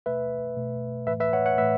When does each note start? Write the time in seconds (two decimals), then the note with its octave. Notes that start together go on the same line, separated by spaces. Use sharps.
0.06 B2 A3 B4 E5
0.57 B2 A3
1.07 A2 E3 A3 B4 E5
1.20 B4 E5
1.33 C#5 F#5
1.45 C#5 F#5
1.58 A2 E3 A3 B4 E5